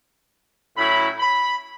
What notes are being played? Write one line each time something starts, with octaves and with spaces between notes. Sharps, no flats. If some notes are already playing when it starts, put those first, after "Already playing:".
A2 F#3 C#4 E4 B5
B5